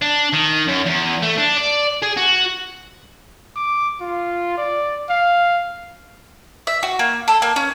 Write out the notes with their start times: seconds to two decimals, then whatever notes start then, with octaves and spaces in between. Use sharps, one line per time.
0.02 D4
0.33 D#3
0.68 F#2
0.86 E2
1.22 A3
1.38 D4
1.57 D5
2.02 G#4
2.17 F#4
3.56 D6
4.01 F4
4.58 D5
5.09 F5
6.67 E5
6.83 F#4
6.99 A#3
7.28 A4
7.42 A#3
7.56 C#4